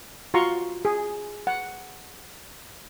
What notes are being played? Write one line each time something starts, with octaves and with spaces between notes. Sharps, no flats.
F4 F#4 A#5 C6 C#6
G#4
F#5